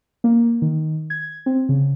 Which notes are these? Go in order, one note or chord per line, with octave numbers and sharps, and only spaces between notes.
A#3
D#3
G#6
C4
C#3